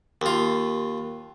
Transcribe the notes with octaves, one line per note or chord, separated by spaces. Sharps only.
D#2 F4